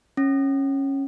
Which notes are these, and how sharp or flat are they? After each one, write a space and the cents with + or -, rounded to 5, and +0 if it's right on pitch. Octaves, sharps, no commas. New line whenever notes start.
C#4 -15